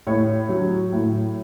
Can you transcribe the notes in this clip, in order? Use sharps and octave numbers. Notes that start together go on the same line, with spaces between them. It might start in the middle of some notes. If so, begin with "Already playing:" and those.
A2 C#5
F#3
A2